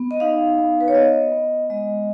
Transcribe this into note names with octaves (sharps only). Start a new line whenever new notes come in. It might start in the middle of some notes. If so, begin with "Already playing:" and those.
Already playing: B3
D#5
D#4 F5
B3
B4
C#5
B3 D#5
B3
G#3 D#5